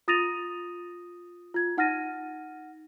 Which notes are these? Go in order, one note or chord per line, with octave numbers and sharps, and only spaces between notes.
F4 D#6 A6 A#6 D#7 F7
F4 G#6
D#4 F#5 F6 A6 A#6 D#7